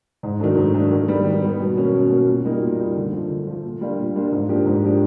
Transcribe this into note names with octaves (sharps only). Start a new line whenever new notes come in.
G#2
D#3 F#3 A3 D4
G#2
D#3 F#3 A3 D4
D#3
G3 B3
D#3
G3 B3
B2
F#3 A#3 C#4
B2
F#3 A#3 C#4
A#2
G3 A#3 D#4
A#2
G3 A#3 D#4
D3
F3 A3
D3
F3 A3
A#2
G3 A#3 D4 F4
A#2
G3 A#3 D4 F4
G#2
F3 A#3 D4 G4
G#2
F3 A#3 D4 G4